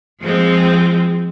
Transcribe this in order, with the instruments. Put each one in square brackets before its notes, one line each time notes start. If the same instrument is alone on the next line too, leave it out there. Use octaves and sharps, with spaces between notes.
[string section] F3 G#3 C4